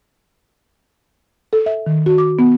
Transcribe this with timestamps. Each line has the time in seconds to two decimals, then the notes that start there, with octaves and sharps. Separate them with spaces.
1.53 A4
1.66 E5
1.86 D#3
2.06 F#4
2.18 D6
2.39 B3